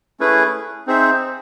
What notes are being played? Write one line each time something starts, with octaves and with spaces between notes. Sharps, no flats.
A3 C#4 E4 G#4 B4
C4 D#4 G#4 C5 E5